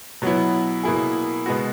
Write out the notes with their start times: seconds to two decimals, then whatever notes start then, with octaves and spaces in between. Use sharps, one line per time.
0.22 B2 F#3 B3 E4
0.83 B2 A#3 E4 G#4
1.46 B2 G#3 B3 F#4